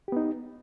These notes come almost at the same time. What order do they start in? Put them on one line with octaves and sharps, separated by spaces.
G4 B3 D#4